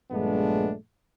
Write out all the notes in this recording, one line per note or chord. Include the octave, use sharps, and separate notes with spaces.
A#1 G2 G#3 A3 B3 D4